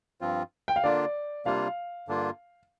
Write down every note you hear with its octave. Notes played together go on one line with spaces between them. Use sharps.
G2 F3 C4 F4
G5
F5
D3 A#3 D4 F4 D5
C3 G3 A#3 D4 F4 F5
G2 D3 A#3 D4 F4